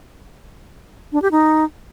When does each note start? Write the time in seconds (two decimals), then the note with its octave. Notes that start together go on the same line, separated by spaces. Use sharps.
1.12 D4
1.22 G4
1.31 D#4